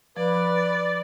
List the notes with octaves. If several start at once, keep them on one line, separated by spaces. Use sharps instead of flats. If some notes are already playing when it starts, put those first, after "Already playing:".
F3 B4 D5